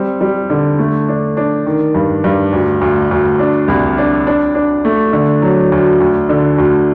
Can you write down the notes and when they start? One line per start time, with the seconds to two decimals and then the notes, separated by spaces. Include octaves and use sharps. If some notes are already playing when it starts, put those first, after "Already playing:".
Already playing: G3 C4
0.21 G3
0.50 D3
0.79 A3
1.08 D4
1.37 D4
1.66 D#3
1.95 G2
2.24 G2
2.52 D2
2.81 D2
3.11 D2
3.39 D4
3.68 C2
3.98 D4
4.27 D4
4.55 D4
4.85 A3
5.13 D3
5.42 F#3
5.72 D2
6.00 D2
6.29 D3
6.58 D2